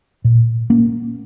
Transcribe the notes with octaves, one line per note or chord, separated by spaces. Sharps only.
A#2
A#3 C#4